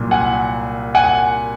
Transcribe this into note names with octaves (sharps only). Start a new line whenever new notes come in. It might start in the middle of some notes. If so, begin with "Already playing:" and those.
Already playing: C2 A#2 F#3
F#5 G#5
F#5 G#5